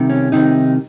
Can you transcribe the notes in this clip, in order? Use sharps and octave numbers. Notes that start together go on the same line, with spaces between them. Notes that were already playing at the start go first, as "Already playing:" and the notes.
Already playing: C2 C3 D#3
C#4
C2 C3 D#3 D#4